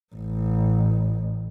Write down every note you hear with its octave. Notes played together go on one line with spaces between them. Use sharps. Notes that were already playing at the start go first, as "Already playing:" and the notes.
A1